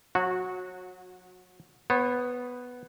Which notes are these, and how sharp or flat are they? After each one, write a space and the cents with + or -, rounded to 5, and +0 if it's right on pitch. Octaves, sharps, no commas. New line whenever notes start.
F#3 -30 F#4 -10
B3 +0 C#5 -40